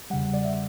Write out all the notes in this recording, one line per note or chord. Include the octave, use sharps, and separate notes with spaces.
E2 C#3 G3 F#5
D5
E5